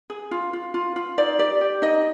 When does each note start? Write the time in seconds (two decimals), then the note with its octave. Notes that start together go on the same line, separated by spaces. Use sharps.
0.10 G#4
0.31 F4
0.53 F4
0.74 F4
0.96 F4
1.18 D#4 D5
1.39 G4 D5
1.61 G4
1.82 D#4 D#5